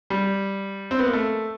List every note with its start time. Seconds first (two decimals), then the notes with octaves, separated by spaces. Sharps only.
0.10 G3
0.91 C4
0.99 B3
1.05 A#3
1.13 A3